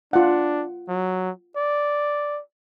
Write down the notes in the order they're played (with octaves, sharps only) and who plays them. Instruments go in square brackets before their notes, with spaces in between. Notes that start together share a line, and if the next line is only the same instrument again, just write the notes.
[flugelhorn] D4 [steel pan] F4 F#5
[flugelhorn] F#3
D5